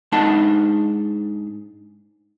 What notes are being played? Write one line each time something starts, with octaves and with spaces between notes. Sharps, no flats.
G#2 D4 D#4 F#5 A5